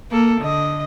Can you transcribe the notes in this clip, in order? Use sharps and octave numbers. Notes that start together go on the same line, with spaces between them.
A#3 A4
D3 D#5